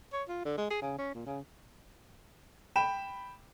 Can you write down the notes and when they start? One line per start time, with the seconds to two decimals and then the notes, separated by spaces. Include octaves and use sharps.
0.13 C#5
0.28 F4
0.45 D3
0.57 G#3
0.70 G#4
0.82 C#3
0.98 C#4
1.15 A#2
1.26 C#3
2.76 G5 B5 E7